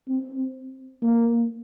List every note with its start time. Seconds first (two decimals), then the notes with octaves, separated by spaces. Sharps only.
0.09 C4
1.02 A#3